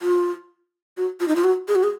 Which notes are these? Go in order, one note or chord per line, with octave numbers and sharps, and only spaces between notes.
F4
F#4
F4
D#4
F4
F#4
G#4
F#4
G#4